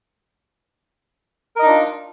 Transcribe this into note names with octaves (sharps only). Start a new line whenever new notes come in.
D4 D#4 F4 A#4 D#5